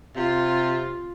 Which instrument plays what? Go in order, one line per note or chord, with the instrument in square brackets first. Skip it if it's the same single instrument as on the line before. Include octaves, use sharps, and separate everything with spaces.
[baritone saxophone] C3 [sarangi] F4